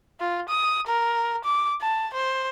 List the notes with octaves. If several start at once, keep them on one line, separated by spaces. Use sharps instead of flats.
F4
D#6
A#4
D6
A5
C5